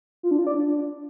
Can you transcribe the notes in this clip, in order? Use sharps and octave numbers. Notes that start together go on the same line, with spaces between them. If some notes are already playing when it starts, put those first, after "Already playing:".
F4
D4
F4
D5
D4